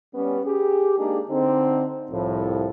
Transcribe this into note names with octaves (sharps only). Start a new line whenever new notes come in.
G3 B3 C#4
G4 G#4
G#3 A#3 D4 D#4 G4 G#4
D3 C4 D#4
C2 A2 F3